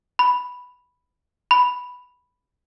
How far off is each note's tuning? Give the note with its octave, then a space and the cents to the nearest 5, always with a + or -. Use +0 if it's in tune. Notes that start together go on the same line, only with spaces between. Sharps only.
B5 +0
B5 +0